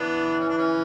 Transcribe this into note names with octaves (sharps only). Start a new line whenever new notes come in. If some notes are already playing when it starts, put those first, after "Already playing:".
Already playing: E3 B3 D4
C#4
D4
C#4